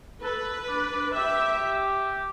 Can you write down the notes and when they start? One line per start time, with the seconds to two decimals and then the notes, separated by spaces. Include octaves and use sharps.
0.22 A4 B4
0.68 D4
0.92 D4
1.14 G4 E5